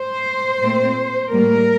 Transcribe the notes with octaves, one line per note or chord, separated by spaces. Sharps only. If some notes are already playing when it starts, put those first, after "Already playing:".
Already playing: C5
A#2 A3 C4
A2 G3 A#3 A#4